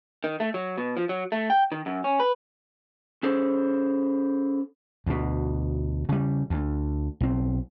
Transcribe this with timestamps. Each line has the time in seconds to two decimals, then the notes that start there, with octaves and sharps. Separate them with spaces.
0.24 D#3
0.40 A3
0.54 F#3
0.78 B2
0.97 F3
1.09 F#3
1.32 A3
1.50 G5
1.72 D#3
1.86 F#2
2.04 C#4
2.20 B4
3.23 C#4 G#4 A4 C5
5.06 D2 B2
6.09 C#3 G3
6.50 D2
7.20 B1 C4